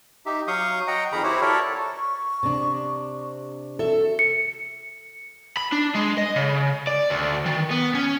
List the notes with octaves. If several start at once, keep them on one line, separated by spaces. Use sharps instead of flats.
D#4 G4 E5
F#3 F5 C#6 D#6 G6
D#5 F#5 G5 A#5
F2 D#3 G#4 A#5 B5
E4 F#4 G4 C5 C#5
A4 A#4 C#5 D5 E5
C#6
C3 D4
F#4 A4 E5
C#7
B5
D4
G#3
D#5
C#3
D5
D2
D#3
B3
C#4